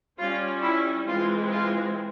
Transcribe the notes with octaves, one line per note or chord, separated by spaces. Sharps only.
G3 C#4 F4
E4
E3 G#3 C4 F4
F4